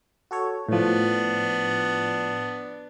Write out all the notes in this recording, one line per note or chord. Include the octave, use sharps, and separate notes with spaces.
F#4 A4 C#5
A2 F3 B3 D4